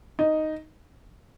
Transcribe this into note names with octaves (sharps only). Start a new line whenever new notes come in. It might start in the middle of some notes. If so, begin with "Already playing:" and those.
D#4